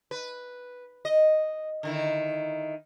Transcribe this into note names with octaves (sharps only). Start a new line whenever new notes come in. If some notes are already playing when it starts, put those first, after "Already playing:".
B4
D#5
D3 D#3 E4